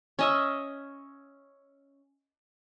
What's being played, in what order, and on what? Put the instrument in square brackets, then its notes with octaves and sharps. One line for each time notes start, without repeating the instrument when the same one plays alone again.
[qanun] C#4 D#5 E5